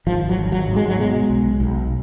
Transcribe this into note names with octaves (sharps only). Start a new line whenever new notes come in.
G#1 F3
F#3
G#1
F#3
G#2
G#3
F#3
B2 G#3
B1
B1